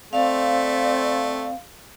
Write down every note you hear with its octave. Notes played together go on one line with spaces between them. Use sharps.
A3 C4 D5 F5